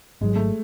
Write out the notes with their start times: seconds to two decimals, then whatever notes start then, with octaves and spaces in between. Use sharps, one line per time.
0.21 G#1 G#2 F#3 G#3
0.35 A3